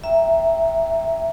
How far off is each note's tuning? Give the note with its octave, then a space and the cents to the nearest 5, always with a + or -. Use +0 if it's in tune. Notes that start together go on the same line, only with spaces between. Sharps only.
E5 +0 G5 +0 A#5 +0